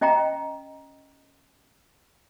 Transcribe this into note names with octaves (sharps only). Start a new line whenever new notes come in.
C#4 D#5 G5 A#5